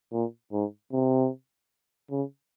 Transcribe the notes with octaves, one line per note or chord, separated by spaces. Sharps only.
A#2
G#2
C3
C#3